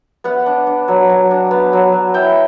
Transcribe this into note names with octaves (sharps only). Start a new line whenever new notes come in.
B3 F#5
D4
D4
F#3
F#3
D4
B3
F#3
F#3
E4 G5